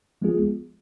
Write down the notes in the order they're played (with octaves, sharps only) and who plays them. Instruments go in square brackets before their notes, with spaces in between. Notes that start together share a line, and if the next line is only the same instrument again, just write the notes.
[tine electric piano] F3 G#3 B3 F4 G#4